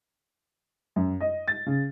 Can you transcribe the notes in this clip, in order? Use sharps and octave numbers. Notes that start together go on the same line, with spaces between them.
F#2
D#5
A6
C#3